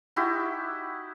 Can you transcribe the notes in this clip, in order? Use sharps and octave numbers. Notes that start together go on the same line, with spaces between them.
D#4 E4 F#4 G4